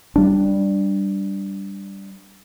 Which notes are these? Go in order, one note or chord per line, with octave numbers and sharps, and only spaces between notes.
G3 D4